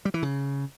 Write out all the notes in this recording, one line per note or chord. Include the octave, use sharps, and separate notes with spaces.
G3
E3
C#3